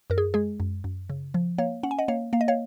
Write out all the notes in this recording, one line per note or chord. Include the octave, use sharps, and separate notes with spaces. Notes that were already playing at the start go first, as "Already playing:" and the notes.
F#2 A#4
G#4
G#3 G#4
F#2
F#2
C#3
F3
A#3 C#5 F5
C#4 F#5
G#5
D#5 F#5
A#3 C#5 F5
A#3 F5
D#5
C#5 F5